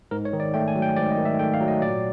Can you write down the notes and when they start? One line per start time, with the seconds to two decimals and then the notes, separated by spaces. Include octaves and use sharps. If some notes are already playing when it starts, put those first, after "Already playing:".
0.11 G#2 A#4
0.25 C#5
0.33 D#3
0.40 D5
0.54 A3 G5
0.68 G#5
0.75 F#3
0.82 G5
0.97 G#2 D5
1.11 D#5
1.18 D#3
1.25 E5
1.39 A3 G5
1.54 F5
1.61 F#3
1.68 D#5
1.82 A#2 D5